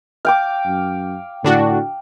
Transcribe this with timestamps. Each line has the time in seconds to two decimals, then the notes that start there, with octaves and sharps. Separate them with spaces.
0.25 F5 G5 D6
0.65 F#2
1.45 A2 D3 D4 F#4